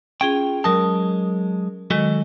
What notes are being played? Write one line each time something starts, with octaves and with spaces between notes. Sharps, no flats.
C#4 F4 G#4 G5
F#3 G#3 A#4 A5 D#6
D#3 F#3 G#3 F#4 A4 D#5